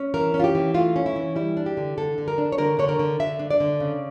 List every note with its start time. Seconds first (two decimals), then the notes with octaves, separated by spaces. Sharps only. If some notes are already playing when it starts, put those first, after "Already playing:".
Already playing: C#4
0.14 E3 A#4
0.34 C#4
0.40 F4
0.44 G4
0.55 E3
0.74 A3 F4
0.96 C#4
1.06 E4
1.16 E3
1.36 G3 E4
1.57 D4
1.66 G4
1.77 D3
1.98 D3 A4
2.18 D3
2.28 A#4
2.38 D4
2.52 C#5
2.58 D3 A#4
2.79 D3 C#5
2.89 A#4
2.99 D3
3.20 D3 E5
3.39 D4
3.50 D5
3.60 D3
3.80 C#3